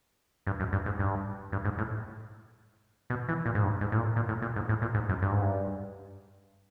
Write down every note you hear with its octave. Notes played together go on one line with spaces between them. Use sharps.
G2
F#2
G2
G#2
G2
G2
G#2
A2
B2
E3
A#2
G#2
G2
G#2
A2
A#2
A#2
A2
A#2
G#2
A2
A#2
G#2
F#2
G2
G#2
G2